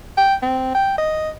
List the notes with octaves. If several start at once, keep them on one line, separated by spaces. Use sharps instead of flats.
G5
C4
G5
D#5